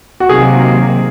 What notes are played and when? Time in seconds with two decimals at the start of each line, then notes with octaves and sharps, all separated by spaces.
0.20 F#4
0.29 C3 D#3 F#3 A#3 G#4